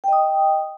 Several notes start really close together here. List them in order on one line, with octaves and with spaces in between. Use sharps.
G5 D#5 D#6